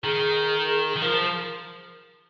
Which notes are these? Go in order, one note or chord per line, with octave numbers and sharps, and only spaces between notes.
D#3 G#4
D#3
F3 A#4